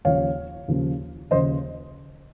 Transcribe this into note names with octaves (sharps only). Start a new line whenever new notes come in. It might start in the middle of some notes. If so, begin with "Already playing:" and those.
D#2 C#3 F3 C#5 F5
D#2 C#3 F3
D#2 C#3 F3 C5 D#5